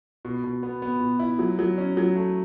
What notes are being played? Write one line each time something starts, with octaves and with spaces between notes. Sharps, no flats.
B2
B2
B3
B3
B2
E4
F#3
F#3
C#4
F#3
A3